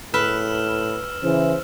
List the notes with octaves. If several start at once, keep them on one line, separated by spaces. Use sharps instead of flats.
A2 B4 E6 F6 E7
C#3 E3 C5